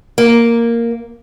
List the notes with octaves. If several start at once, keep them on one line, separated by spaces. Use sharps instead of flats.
A#3